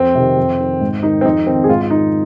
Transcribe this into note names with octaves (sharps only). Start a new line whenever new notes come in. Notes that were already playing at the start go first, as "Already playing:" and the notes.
Already playing: F2 C4
C3 D#3
F2
D#3
G#2
D#3 D#4
C4
F2 D#4
D#3 C4
G#4
G#2 F4
F4
D#3 D#4